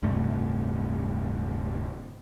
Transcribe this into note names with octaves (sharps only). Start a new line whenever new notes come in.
D1 G2 C3 A3